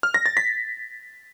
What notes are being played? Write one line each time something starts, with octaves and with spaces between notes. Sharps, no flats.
F6
A#6
A6
B6